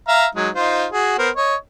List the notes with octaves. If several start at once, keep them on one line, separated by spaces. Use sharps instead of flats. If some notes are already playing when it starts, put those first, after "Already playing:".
E5 F5 A#5
F#3 G#3 D#4
D#4 F4 C5
F#4 G#4
B3 A#4 C5
C#5 D#5